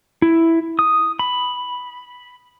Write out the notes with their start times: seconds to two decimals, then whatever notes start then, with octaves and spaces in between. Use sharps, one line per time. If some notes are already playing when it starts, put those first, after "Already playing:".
0.22 E4
0.79 D#6
1.19 B5